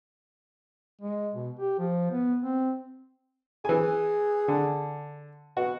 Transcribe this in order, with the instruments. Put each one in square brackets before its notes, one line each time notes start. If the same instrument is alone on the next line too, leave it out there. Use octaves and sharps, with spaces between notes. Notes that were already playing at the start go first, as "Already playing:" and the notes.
[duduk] G#3
B2
G4
F3
B3
C4
[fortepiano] E3 G#5 [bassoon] G#4
[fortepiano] D3
[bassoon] B2 [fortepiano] F#4